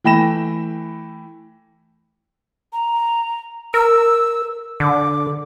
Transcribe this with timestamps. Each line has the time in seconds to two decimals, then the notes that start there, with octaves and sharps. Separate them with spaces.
0.04 E3 A3 G5 B5 A#6 E7
2.73 A#5
3.74 A#4 E6
4.80 D3 D6